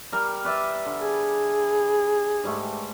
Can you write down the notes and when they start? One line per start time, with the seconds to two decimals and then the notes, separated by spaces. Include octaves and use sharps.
0.12 G3 A#4
0.45 B4 D5 E5
0.86 D3
1.00 G#4
2.44 G#2 G3 A3